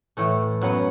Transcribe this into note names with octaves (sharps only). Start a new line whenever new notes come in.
A2 E3 A3
F#2 F#3 B3